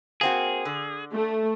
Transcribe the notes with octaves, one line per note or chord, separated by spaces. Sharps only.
A#3 C4 F#4 G#4
D3
A3